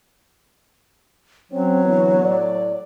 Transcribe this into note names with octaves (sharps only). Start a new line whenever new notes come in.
F#3 C4 C#4 C#5
D3 E3 B3
A2 A3 D5